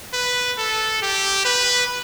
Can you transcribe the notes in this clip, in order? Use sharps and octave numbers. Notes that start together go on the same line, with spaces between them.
B4
A4
G4
B4